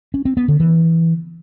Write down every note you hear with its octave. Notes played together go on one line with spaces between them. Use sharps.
C#4
C4
B3
D3
E3